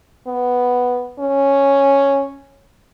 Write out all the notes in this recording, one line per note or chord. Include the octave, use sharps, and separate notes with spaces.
B3
C#4